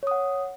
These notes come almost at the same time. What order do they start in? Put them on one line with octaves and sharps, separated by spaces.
C#5 D#6 F#5